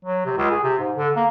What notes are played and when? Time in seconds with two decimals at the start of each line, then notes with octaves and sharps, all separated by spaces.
0.05 F#3
0.25 C3
0.38 C#2
0.50 G#4
0.64 C3
0.79 G#2
0.97 D3
1.16 A#3